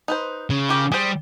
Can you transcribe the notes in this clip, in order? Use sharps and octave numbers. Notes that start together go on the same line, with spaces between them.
D#4 B4 C5
C#3
F4 G4 A#4
G3 G#4 C5